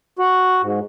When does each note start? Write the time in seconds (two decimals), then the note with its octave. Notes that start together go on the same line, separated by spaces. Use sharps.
0.19 F#4
0.62 G#2